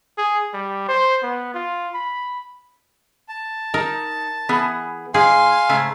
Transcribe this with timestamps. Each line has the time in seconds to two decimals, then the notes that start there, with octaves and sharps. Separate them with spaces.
0.18 G#4
0.54 G3
0.88 C5
1.23 B3
1.54 F4
1.94 B5
3.29 A5
3.74 D#4 A#4
4.49 E3 B3 G#4
5.14 G#2 G#4 F5 G#5 C6
5.69 G#2 C#3 A3